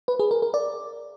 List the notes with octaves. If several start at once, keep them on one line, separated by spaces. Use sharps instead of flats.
B4
G#4
A#4
A#4
D5